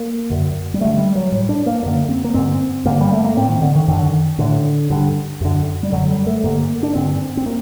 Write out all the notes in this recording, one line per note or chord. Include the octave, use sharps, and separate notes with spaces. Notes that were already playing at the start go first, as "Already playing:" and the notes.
Already playing: A#3
F#2 D3
G3
G2 D3 A3
G3
F#3
A2 G3
D4
A#3
F#2 D3 A#3
C4
A#3
G2 D3 C4
G2 D3 A#3
G3
A3
A#3
A2 C4
D#3
D3
D#3
F#2 D3 D#3
A2 D3
G2 D3
F#2 D3
G3
F#2 D3 F#3
G3
A3
G2 D3 A#3
D4
G2 D3 C4
C4
A#3